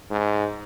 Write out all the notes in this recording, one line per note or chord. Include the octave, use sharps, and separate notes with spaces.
G#2